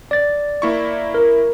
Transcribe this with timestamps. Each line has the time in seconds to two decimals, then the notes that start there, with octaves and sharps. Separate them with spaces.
0.11 D5 A6
0.62 A#3 E4 C#6
1.14 A#4